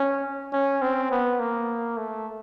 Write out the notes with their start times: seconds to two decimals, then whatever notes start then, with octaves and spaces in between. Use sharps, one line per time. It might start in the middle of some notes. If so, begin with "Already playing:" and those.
Already playing: C#4
0.53 C#4
0.82 C4
1.11 B3
1.39 A#3
1.97 A3